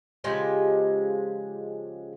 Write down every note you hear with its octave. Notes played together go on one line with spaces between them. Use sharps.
C#3 F3 G#3 G4